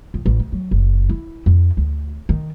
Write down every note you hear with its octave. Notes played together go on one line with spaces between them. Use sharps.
F2
A1
D2
F#3
F#1
E4
F2
D2
D#3